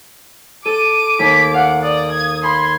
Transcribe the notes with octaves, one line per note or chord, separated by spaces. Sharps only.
A4 D6 D#7
D#2 B6
F5 F#5
D5 D#6
G#6
B5 C6 G#6